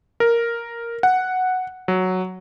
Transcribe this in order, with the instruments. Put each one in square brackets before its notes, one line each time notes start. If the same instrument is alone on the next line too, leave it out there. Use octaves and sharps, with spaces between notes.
[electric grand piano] A#4
F#5
F#3